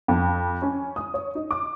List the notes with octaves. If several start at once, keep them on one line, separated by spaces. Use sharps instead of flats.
F2
C#4
D#6
C#5
D#4
D6